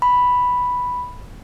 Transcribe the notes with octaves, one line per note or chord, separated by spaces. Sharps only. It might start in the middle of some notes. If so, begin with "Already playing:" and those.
B5